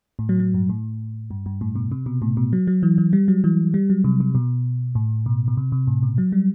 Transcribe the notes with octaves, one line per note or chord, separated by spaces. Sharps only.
A2
F#3
F#3
G2
A2
G2
G2
A2
B2
C3
B2
A2
B2
F#3
F#3
E3
E3
G3
F#3
E3
G3
F#3
C3
C3
B2
A2
B2
B2
C3
C3
A2
B2
F#3
G3